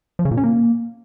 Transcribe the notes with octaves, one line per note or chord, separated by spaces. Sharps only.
F3
C#3
A#2
C#4
A#3